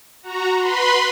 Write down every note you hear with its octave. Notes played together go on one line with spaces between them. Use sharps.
F#4 A#5
B4 B5 C6